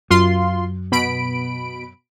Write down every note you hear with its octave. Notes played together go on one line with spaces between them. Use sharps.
F#2 F4 C6
B2 B5 D7